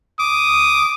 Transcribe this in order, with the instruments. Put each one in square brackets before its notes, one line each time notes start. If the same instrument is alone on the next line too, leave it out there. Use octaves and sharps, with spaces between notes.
[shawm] D6 [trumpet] D#6